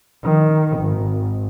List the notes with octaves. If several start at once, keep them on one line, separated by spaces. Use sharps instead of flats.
D#3
G#1